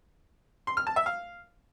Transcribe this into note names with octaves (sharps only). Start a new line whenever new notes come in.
C6
F6
A5
E5
F5